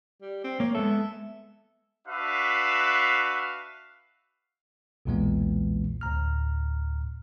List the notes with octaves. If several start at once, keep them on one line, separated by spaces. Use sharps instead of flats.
G3
C4
A#3 C#5
G#3 B3 A4 E5
D4 F#4 B4 E5 F5
B1 E2 A#2 E3 G#3 B3
D2 A2 A#5 F6